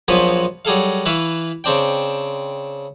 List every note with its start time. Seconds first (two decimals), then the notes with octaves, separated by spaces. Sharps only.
0.08 A#1 F3 F#3 B3 B4 G#5
0.65 F#3 G3 G#4 A4 F5
1.06 E3 B4 E5 F5 C#6
1.64 C#3 C4 D4 G5